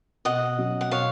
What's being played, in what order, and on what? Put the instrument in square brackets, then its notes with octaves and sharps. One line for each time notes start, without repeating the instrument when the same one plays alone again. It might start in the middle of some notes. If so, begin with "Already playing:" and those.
[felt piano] B2 [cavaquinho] D#5 F#5
[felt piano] F#3 C#4
[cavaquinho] F#5
[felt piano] B2 [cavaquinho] C#5 F5